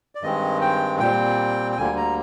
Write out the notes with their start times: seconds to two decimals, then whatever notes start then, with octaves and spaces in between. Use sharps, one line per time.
0.15 D5
0.22 G2 D#3 G#3 C4 D#5
0.61 G5
1.00 A#2 G3 C4 G5
1.72 G5
1.78 D2 D3 G3 A#3 G#5
1.97 A#5